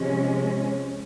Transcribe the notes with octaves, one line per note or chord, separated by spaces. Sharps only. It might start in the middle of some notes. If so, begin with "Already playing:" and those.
Already playing: C3 F3 G#3 C#4